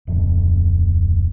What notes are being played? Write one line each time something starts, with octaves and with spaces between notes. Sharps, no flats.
D1 F2